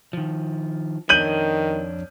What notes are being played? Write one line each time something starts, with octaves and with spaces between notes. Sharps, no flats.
D#3 F3
F2 D#3 D4 C#5 G6 D#7 F#7